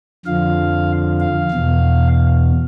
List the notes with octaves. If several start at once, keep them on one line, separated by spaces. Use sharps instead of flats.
F2 D3 F3 F5
F5
E2 B2